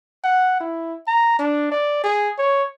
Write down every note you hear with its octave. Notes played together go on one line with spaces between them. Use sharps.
F#5
E4
A#5
D4
D5
G#4
C#5